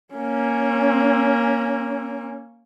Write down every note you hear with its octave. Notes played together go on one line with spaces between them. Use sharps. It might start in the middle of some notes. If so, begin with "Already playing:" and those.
A#3 C#4